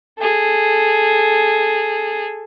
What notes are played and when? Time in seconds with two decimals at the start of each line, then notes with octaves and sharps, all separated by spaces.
0.18 G#4 A4